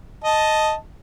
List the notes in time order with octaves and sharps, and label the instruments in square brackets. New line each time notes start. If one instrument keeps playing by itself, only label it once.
[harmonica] D#5 A5